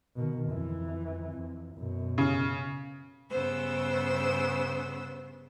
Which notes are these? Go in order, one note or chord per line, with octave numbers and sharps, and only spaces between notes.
B2 D#3
F2 E3
F2
F#2 B2
C#3
G2 C#3 B3 C5 E6